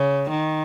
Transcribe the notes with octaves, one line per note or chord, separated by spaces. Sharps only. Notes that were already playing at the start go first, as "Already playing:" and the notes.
Already playing: C#3
D#3